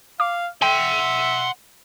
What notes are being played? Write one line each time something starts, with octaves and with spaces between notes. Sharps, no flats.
F5 D6
E5 F#5 G5 C6